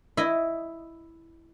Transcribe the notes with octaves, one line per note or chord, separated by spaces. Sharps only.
E4 D#5